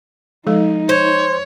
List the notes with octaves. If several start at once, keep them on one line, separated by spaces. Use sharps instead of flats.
F3 G#3 D#4 A4
C5 C#5